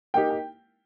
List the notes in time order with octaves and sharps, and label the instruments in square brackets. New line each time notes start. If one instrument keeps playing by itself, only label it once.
[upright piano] A#3 D#4 G4 [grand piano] G5
[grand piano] G5